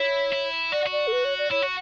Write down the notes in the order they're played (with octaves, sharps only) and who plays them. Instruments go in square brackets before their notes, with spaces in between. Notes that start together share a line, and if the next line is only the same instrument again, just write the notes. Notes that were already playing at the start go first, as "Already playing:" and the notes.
Already playing: [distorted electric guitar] E4 [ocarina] C#5
[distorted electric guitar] E4
[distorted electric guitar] F#4 [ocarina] D5
[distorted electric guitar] F#4
[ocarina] D5
A4
B4
C#5
D5
[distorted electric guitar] E4 [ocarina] C#5
[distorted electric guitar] F#4